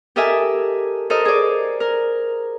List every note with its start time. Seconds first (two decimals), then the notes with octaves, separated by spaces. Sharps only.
0.16 G4 A4 A#4 D#5 E5 G#5
1.10 A4 A#4 C5 D#5
1.25 G#4 D5
1.80 A#4